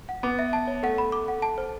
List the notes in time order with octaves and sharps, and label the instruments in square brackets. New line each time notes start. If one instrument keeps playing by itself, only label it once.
[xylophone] F#5
[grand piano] B3 [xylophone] D6
[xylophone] E5
A5
C#5
[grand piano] A3 [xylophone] F#5
[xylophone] B5
D6
F#5
A5
C5